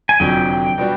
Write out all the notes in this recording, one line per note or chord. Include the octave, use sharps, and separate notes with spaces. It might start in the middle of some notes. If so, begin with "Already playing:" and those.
G#5
F1 F2 D3 F#3 G5
B2 G3 B3 D4 F#4